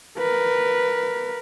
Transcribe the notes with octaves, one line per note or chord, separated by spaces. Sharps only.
A#4 B4